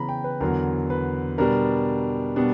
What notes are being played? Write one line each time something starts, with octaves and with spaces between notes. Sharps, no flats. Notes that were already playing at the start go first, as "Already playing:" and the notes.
Already playing: C#3 E3 B3 A#5 B5
G5
B4
E2 D3 F#3 A#4
B4
B2 G3 B3 D4 A#4
B2 G3 B3 D4